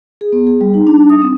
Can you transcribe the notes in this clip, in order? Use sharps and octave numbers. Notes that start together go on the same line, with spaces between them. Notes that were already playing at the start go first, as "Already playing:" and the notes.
G#4
B3
G#4
G3
D#4
D4
D#6
C4